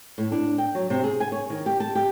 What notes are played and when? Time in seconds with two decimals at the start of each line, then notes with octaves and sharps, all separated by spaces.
0.18 A2
0.32 D4
0.58 G5
0.75 F#3
0.90 C3
1.04 G#4
1.20 G#5
1.32 C#5
1.50 D#3
1.66 G4
1.80 A5
1.95 G4